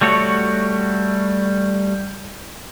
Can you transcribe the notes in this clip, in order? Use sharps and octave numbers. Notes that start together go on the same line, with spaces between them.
G3 A3 F#4 C#5